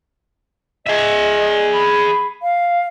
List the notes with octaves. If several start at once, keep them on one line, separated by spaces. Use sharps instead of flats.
G#4 D#5 E5
B5
F5